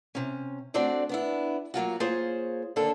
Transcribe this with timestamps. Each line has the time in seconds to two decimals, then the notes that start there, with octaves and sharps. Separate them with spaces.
0.15 C3 C#4
0.74 A3 C4 D4 F#4 D5
1.09 B3 D4 E4
1.74 F#3 A#3 F4 F#4
2.00 A#3 F4 G#4 C5 C#5
2.76 D#2 D3 A#3 D4 A4